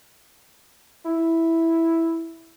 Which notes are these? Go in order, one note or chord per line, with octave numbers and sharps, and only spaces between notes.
E4